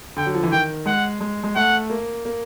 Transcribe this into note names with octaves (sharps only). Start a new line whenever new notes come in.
D3 G5
F#3
F3
E3
D#3 G5
G#3 F#5
G#3
G#3
A3 F#5
A#3
A#3